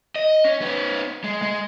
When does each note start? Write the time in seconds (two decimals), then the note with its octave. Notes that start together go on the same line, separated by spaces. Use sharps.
0.16 D#5
0.45 C#4
0.61 B3 C#4
1.24 G#3
1.42 G#3